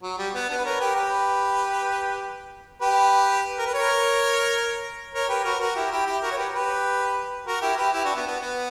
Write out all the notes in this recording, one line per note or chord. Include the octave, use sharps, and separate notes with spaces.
F#3
G3
B3
B3 D4
B4
A#4 C#5
G4 B4
G4 B4
G4 B4
A#4
B4
A#4 C#5
A#4 C#5
G4 B4
F#4 A#4
F#4 A#4
E4 G4
E4 G4
E4 G4
F#4 A#4
C#5
G4 B4
G4 B4
F#4 A#4
E4 G4
G4 B4
E4 G4
D4 F#4
B3
B3
B3